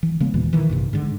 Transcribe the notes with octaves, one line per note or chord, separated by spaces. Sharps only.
E3
C#3 G#3 B3
D#2 A#2 E3
D#3 E3
A#1 G2 C3
G#2 D3